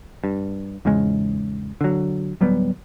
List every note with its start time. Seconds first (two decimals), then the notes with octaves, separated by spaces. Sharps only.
0.24 G2
0.85 E2 G#2 C#3 G#3
1.81 D3 F#3
2.41 D1 F#3 G3 B3